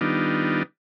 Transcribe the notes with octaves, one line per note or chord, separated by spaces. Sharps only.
D#3 G3 B3 D4 D#4 F4